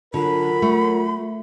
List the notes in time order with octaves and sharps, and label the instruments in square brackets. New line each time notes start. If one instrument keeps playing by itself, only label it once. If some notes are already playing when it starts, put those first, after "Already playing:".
[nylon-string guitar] D3 [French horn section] F#3 A4 A#4 [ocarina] F4 [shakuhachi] B5
[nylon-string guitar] A3